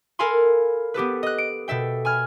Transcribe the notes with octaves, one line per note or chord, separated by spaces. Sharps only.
A4 A#4 F5 G#5 B5 C6
B3 G4 A4 B4
D#5 F#6
D7
B2 A4 E5 G5
G#5 B5 F6 G#6